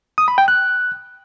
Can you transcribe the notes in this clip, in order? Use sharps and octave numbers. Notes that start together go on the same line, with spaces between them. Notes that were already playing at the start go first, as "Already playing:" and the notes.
D#6
B5
G5
F#6